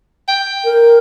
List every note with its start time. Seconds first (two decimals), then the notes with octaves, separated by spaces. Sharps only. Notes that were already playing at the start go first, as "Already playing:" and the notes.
0.28 G5
0.64 A#4